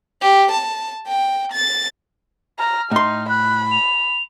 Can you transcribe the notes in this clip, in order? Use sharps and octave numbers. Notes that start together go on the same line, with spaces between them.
G4
A5
G5
A6
A#5 F6
A2 D#4 C6
B5 F#6
F7